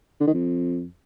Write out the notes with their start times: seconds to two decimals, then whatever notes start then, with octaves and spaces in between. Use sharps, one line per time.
0.21 D3
0.27 D#3
0.33 F2